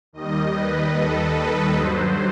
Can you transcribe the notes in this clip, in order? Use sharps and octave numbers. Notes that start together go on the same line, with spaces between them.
D#2 D#3 G3 D#5
B4
A4
B4
G2 F#3 C5